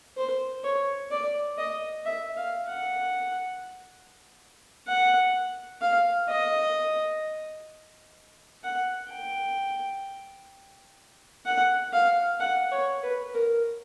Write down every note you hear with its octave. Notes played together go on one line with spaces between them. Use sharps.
C5
C#5
D5
D#5
E5
F5
F#5
F#5
F5
D#5
F#5
G5
F#5
F5
F#5
C#5
B4
A#4